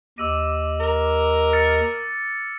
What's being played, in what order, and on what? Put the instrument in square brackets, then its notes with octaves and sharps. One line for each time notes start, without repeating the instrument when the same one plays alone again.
[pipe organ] D#2 G4 D#5 [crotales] D6 E6 D#7
[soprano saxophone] A#4
[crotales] F6 A6 C#7